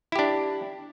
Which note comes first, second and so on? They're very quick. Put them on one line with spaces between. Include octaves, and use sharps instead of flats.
E4 G4 D4